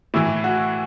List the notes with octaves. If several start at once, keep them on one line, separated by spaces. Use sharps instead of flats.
A2 E3 E4
F#4